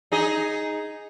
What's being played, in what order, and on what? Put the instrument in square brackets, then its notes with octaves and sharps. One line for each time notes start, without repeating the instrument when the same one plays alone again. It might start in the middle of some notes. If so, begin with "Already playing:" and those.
[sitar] D#4 G#4 D#5